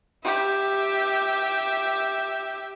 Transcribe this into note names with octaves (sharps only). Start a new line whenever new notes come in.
G4 E5